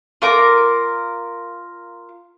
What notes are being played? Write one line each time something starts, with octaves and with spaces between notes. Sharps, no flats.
F4 A#4 D6